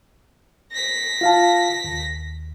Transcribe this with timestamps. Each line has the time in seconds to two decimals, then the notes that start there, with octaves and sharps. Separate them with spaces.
0.71 A#6 B6
1.21 F4 F5 A5
1.84 D#2